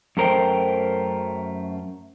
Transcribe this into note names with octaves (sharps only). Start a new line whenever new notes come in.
F#2 A3 A#4 C5 G5